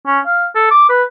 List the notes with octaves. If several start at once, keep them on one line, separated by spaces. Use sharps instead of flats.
C#4
F5
A4
D6
B4